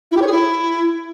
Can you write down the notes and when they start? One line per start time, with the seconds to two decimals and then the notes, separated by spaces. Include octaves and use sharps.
0.11 E4
0.16 G4
0.21 C#5
0.26 G#4
0.31 E4